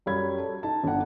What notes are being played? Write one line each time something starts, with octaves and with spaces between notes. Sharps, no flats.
F#2 G3 C#5 B5 G#6
A4
D#4 A5
G1 D4 F#5